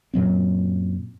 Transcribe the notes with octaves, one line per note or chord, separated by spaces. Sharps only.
F#2 A#2 F#3 C4